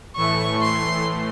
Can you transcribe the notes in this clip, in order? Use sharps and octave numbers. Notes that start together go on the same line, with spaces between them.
A2 E3 A3 C#6
C6